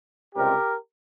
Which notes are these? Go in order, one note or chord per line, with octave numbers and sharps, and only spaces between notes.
C#2 C3 G3 C4 G4 A#4